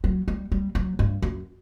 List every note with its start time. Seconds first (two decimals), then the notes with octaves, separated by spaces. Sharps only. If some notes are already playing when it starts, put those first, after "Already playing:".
0.04 F#3
0.28 G3
0.52 G3
0.75 F#3
0.99 G2
1.22 F#2